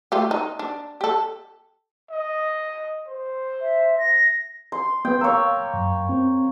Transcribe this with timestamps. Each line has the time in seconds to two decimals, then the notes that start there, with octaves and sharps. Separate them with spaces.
0.12 A3 F4 G4
0.31 D#4
0.59 D4
1.01 G4 A4
2.11 D#5
3.08 C5
3.61 E5
3.98 A#6
4.72 C6
5.05 B3 B4 G5
5.21 A#3 C#5 F5 E6
5.74 F#2
6.09 C4